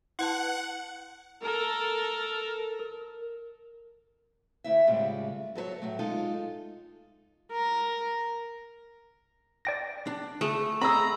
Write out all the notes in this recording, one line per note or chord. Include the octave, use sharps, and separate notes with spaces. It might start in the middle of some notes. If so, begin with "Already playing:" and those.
E4 B4 F#5 A5
A4 A#4
A#4
D2 E4 E5
A2 C#3 G3 G#3 F4
F#3 A4 B4 C#5
A2 F#3 A3
G#3 D#4 F4 A4
A#4
D5 G5 A#6
D4
A3 G#4
C4 G#4 D#5 A#5 B5 E6